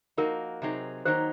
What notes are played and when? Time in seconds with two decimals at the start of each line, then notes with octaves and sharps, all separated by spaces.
0.17 F3 A#3 D#4 F#4 A#4
0.62 C3 F#3 C4 D#4 G#4
1.05 D#3 F#3 A#3 D#4 C5